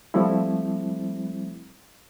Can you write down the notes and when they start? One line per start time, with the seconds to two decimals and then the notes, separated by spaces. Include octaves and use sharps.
0.14 F3 G3 A3 C4 E4